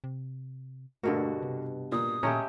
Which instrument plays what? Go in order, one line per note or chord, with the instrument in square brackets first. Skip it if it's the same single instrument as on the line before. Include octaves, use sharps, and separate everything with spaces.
[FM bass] C3
[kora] G2 B2 F#4 [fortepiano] D3 A#3 [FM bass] A3
[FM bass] C3
[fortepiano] A#2 [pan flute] D#6
[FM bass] A#2 [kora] G#3 A3 G4 [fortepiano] C#4 C#5 A#5